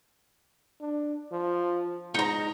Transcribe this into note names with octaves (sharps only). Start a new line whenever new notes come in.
D4
F3
G#2 D#4 A#5